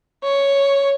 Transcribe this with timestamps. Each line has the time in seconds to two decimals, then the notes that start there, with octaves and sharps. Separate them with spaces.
0.23 C#5